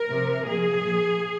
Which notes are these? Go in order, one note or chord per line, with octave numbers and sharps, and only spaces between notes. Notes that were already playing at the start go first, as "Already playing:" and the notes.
Already playing: A#4
C3 F3
A#2 F3 G#4
A#2 F3